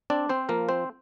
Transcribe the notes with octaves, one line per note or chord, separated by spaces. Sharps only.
C4 D4 D5
C4 C5
F3 A#3 A#4
C4 C5